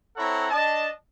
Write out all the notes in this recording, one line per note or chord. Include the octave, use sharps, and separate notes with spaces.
C4 E4 A4 C#5 F#5 A#5
D4 D#5 A5